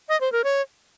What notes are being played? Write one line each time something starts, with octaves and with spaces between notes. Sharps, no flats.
D#5
C5
A#4
C#5